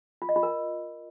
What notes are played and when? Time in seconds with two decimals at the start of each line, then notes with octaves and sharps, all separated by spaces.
0.22 F4
0.29 D#5
0.36 F4
0.43 A#4